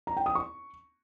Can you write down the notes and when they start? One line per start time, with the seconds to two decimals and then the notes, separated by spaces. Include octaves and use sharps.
0.07 A#5
0.17 G5
0.26 D#6
0.35 C#6